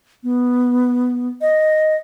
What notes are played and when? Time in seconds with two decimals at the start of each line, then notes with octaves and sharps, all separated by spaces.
0.23 B3
1.41 D#5